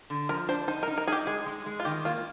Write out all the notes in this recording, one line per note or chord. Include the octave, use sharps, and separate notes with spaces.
D3
F3 A#4
D4 C5
D#4 C5
A#4
D#4
A#4
D#4 G4 G#4
G#3 G#4
G#3
G#3
F4
D#3 G4
A#3 F4